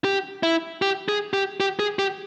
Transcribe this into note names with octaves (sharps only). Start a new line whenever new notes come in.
G4
E4
G4
G#4
G4
G4
G#4
G4